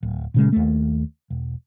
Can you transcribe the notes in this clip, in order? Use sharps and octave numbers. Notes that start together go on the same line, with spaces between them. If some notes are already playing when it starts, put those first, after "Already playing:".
D1
A#2 C#3 G#3
D#2 A3
E1